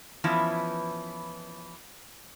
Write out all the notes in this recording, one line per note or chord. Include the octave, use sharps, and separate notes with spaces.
E3 F3 B3 C#4 E4